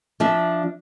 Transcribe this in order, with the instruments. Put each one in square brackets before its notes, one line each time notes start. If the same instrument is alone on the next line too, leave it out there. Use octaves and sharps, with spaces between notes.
[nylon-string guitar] F3 D4 E5